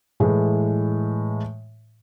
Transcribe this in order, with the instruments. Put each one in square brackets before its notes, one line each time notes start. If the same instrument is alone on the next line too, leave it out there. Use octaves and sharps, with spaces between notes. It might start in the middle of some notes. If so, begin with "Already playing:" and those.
[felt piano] A2 E3 G#3